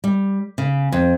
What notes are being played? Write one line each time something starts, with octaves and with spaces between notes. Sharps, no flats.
G3
C#3
F2